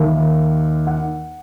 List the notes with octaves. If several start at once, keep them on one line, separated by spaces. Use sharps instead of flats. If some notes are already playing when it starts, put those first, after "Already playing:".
Already playing: D#2 D#3 E5
F#5